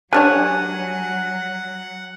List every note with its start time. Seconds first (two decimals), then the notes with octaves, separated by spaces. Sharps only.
0.13 F#3 G3 D4 C#5 F#5 G#5 F#6